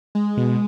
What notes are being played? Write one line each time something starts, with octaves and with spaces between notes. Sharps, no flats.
G#3
B2